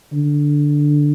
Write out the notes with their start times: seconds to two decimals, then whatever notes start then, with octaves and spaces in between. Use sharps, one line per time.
0.13 D3